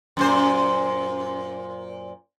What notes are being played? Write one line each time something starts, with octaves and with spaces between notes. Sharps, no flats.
F#2 A#2 C5